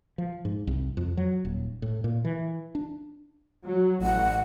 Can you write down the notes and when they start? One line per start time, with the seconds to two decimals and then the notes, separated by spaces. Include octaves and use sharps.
0.18 F3
0.45 G#2
0.67 C2
0.97 F2
1.17 F#3
1.45 D#1
1.82 A2
2.04 A#2
2.25 E3
2.75 D4
3.65 F#3
4.02 A1 F#5